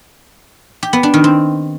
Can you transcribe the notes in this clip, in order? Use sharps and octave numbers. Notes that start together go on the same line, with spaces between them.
G4
B3
D4
D#3
C4